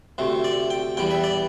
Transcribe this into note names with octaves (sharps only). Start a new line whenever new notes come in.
D2 C3 A3
D5
G5
E2 E3 G3 G5
E5
D5